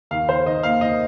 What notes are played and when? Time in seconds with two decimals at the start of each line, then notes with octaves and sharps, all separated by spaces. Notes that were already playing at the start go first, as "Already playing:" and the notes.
0.11 D#2 F5
0.29 D#2 C5
0.46 D#3 D#5
0.63 A#3 F5
0.81 D#2 D#5